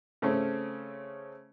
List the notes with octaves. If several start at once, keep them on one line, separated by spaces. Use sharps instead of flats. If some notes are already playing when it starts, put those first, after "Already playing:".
C#3 A3 C4 C#4